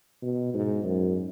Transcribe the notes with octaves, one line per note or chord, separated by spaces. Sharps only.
B2
G#2
F#2